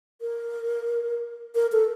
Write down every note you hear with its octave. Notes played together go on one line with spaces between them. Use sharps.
A#4
A#4
A4